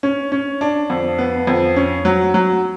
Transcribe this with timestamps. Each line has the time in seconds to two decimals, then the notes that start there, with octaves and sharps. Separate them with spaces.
0.03 C#4
0.32 C#4
0.61 D4
0.90 F2
1.18 B3
1.47 F2
1.76 C#4
2.05 F#3
2.34 F#3